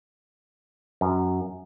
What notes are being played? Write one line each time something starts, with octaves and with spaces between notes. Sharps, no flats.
F#2